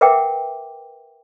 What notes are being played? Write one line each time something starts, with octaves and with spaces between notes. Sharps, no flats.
A#4 B4 E5 F#5 G5 D6